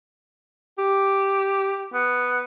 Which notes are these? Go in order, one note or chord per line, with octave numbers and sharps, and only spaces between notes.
G4
B3